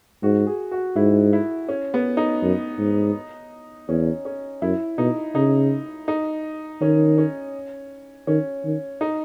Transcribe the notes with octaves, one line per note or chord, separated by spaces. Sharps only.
G#2 F#4
G#4
F#4
G#2 E4
E4
C#4
B3
D#4
F#2
G#2
E2 C#4
C#4
F#2 E4
B2 D#4
C#3 D#4
D#4
D#3 C#4
C#4
D#3 C#4
D#3
D#4